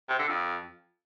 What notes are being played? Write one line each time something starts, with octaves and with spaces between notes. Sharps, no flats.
C3
D3
F2